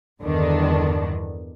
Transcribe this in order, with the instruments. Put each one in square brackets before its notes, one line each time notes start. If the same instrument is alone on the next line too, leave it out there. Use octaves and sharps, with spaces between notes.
[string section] E2 G2 D3 D#3 D4